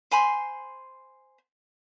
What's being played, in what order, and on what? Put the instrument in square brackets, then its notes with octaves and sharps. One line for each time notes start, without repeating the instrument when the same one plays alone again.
[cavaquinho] C5 G#5 B5 C6